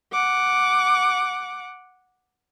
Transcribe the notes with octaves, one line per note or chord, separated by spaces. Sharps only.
F#5 D6